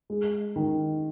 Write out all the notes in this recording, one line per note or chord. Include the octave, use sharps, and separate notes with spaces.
G#3
D#3